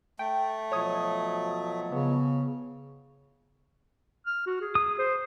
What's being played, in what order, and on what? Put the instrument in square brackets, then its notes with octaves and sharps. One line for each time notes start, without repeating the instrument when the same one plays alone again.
[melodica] A3 [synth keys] G5
[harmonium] B2 F3 F#3 [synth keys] C#5 D#6
[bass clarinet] C#3 [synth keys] B3
[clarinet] F6
F#4
G#4
[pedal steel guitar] D#6
[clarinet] C5